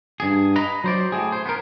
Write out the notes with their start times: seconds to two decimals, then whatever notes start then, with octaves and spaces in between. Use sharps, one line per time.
0.20 G2 G#4
0.56 B4 D#5 A#5
0.84 F#3 C5 D5
1.12 A2 G#4
1.32 C5
1.46 B3 A#4